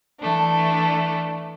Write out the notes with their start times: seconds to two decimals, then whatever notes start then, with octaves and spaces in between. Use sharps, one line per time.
0.19 E3 A3 D4